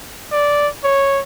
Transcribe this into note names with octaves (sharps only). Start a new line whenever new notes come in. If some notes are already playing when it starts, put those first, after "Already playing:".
D5
C#5